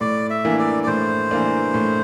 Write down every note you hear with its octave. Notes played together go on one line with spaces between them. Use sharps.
A2 D5
E5
E3 A#3 D4
D5
D5
A2 C5
E3 A#3 D4
A2